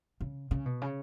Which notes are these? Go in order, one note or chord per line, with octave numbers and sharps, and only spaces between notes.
C#3
C#3
B2
C#3